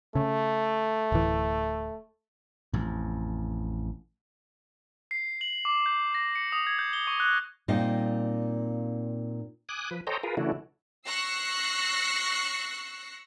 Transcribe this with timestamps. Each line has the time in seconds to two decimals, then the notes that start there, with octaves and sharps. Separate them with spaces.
0.15 C#3 A3
1.12 D1 E3
2.73 A1 F2
5.11 C7
5.41 F#7
5.65 D6
5.86 G6
6.15 A#6
6.35 C#7
6.52 D#6
6.67 G#6
6.79 G6
6.93 G7
7.07 C#6
7.20 F#6
7.68 A#2 G3 C4 D#4 D#5 F5
9.69 G#5 D6 D#6 F#6
9.91 F3 B4
10.07 A4 C5 C#5 D#5 G5 A#5
10.23 F4 G#4 A#4 B4
10.37 C#3 E3 A3 D4 E4 F#4
11.07 C#6 E6 F#6 A#6 C7 C#7